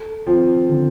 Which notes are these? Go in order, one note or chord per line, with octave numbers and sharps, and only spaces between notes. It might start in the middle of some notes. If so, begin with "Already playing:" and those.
Already playing: A4
F3 C4
D3